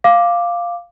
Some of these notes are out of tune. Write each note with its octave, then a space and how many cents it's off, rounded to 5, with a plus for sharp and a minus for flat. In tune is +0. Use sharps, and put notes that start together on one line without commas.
F5 +0 D6 +0